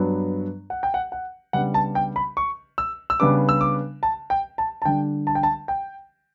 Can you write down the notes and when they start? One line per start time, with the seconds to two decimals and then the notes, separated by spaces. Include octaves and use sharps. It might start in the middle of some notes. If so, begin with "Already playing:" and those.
Already playing: G2 F#3 B3 D4
0.70 F#5
0.83 G5
0.94 F#5
1.12 F#5
1.53 C#3 G3 B3 D4 F#5
1.74 A5
1.95 G5
2.16 B5
2.37 C#6
2.78 E6
3.10 E6
3.20 C#3 G3 B3 D4 D6
3.49 E6
3.61 D6
4.03 A5
4.30 G5
4.58 A5
4.82 A5
4.85 D3 G3 D4 G5
5.27 A5
5.35 G5
5.43 A5
5.68 G5